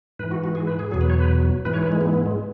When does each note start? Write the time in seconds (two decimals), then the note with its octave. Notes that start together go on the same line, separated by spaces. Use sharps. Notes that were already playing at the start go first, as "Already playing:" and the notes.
0.19 G#2 E3 B4
0.31 F#4
0.44 F#4
0.55 G#4
0.67 B4
0.79 G#4
0.91 E2 B2 F#3 G#4
1.01 B4
1.10 C#5
1.19 B4
1.65 G#2 E3 B4
1.73 C#5
1.83 B4
1.92 G#3
2.01 B3
2.13 B3
2.26 G#3